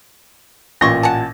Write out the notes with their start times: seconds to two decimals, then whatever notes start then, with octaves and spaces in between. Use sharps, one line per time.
0.81 A1 A#2 B3 C6 C#6 A#6
1.03 F#5 G#5 A5